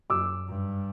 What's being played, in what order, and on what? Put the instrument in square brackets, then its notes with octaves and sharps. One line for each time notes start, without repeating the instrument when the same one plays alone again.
[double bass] F#2 [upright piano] D6 E6
[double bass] G2